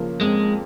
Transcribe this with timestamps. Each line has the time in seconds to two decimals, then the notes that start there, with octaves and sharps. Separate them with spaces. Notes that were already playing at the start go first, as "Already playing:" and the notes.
Already playing: C#3 F3 A#3
0.21 F2 G#3